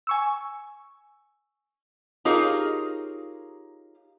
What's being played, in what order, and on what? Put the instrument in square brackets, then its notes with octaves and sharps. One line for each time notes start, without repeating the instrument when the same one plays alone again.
[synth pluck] G#5 C#6 E6
[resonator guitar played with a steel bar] D#4 F4 G4 G#4 A#4 C#5